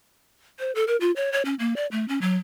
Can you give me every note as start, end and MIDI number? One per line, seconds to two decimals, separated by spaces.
0.59 0.72 72
0.75 0.84 69
0.88 0.96 70
1.01 1.11 65
1.16 1.32 73
1.32 1.42 73
1.45 1.55 61
1.59 1.76 58
1.76 1.87 74
1.92 2.07 57
2.08 2.19 61
2.21 2.37 54